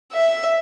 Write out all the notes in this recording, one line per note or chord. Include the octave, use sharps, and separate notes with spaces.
E5